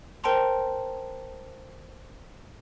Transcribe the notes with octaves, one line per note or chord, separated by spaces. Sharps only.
A#4 C5 G5 A5 A#5 C6